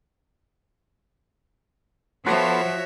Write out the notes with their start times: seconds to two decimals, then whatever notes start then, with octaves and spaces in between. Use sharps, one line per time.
2.26 F3 B3 F#4 A4 C5 C#5 E5